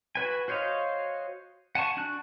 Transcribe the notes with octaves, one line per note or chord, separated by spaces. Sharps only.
F#4 B4 G#5
F#4 C5 C#5 D#5 F5
F#5 G#5 A5 C#6
D4 F#4 F#6